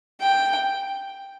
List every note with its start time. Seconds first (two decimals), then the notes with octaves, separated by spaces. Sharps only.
0.21 G5